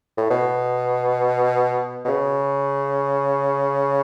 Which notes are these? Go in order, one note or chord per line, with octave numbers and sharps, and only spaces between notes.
A2
B2
B2
C#3